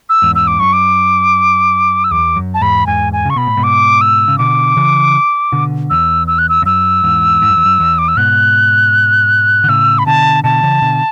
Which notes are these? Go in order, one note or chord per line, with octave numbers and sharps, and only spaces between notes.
E6
E2 G#2
E6
D6
F#2 C#6
D6
E6
E2 D6
F#2
A5
E2 G#2 B5
E2 G#2 G#5
G#5
C#3 C#6
B2 B5
A2
G#2 B2
D6
E6
C#3
B2 D3 D6
C#3 E3
B2 D3
E2 E6
E6
F#6
E6
E2
F#2 E6
E2 G#2
G#2
F#2
E2
F#2
E2
D6
E6
G#2 B2 F#6
D3
A2 C#3 E6
B5
B2 D3 A5
B2 D3 A5
C#3 E3
B2 D3